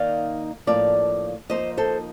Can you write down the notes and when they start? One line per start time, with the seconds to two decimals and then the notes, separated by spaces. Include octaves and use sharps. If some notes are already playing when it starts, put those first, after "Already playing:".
Already playing: D#3 A#3 D#4 D5 F5
0.67 A2 F3 A#3 D4 D5 F5
1.50 F3 A#3 D#4 C5 D#5
1.77 A4 C5